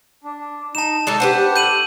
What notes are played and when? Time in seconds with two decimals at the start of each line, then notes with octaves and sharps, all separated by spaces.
0.24 D4
0.75 D#4 A5 E7
1.07 G#3 D#4 A4 D5
1.20 D4 G4 B4 C5 F#5
1.56 A3 G6 D#7 F#7